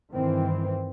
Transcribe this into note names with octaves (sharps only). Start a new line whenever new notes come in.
G2 D#3 E3 C4